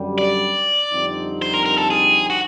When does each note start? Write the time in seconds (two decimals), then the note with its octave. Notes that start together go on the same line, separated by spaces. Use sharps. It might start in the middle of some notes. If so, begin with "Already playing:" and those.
Already playing: F#2 D3 G3
0.18 D5
0.92 F2 D3 G3 C4 D#4
1.42 C5
1.54 A#4
1.66 A#4
1.78 A4
1.91 G#4
2.30 F#4